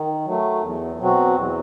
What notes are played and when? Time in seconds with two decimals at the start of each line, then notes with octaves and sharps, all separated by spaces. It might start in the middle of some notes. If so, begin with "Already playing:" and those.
Already playing: D#3
0.26 F#3 A3
0.62 E2
0.99 B2 F#3 C4 F#4
1.36 E2